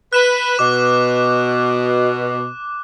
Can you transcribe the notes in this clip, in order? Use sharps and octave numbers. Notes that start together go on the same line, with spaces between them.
B4 F#6 E7
B2 D6